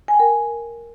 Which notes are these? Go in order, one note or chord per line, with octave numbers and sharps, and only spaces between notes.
G#5
G5
A#4